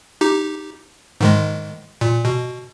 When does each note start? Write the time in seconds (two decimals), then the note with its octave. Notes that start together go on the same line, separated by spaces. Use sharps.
0.21 D#4 G4
1.21 G#2 D#3 G#3
2.01 A#2
2.25 B2